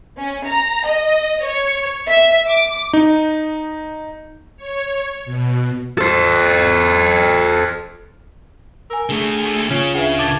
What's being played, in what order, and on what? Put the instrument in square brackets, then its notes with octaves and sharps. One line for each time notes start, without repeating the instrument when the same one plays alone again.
[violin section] C#4
A#5
D#5
C#5
E5
D6
[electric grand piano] D#4
[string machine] C#5
B2
[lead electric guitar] A4 C5
[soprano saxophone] A#4 [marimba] G#5 E6
[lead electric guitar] D3 A3 [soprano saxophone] G#4
[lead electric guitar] C#3 [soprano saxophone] C#4 [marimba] F4
[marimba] D2 B4 E5 [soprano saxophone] G#4
[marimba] A#2 G#6 A6 [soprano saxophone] A5